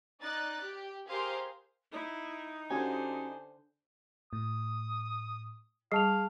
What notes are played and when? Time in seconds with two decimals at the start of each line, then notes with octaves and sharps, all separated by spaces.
0.20 D#4 D5 F#6 A6
0.61 G4
1.07 G4 G#4 A#4 C5 F5 C6
1.92 D#4 E4
2.70 D3 C#4 F#4 G4 C5 G#5
4.33 A2 D#6
5.92 G3 G#4 F5 A5 F7